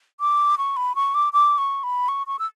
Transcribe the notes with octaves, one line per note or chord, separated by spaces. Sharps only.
D6
C#6
B5
C#6
D6
D6
C#6
B5
C#6
C#6
E6